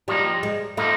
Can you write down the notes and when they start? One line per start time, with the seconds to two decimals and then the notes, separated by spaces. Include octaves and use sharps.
0.08 F3 G3 A#3 D#4
0.43 G#3
0.77 F3 A3 A#3 D#4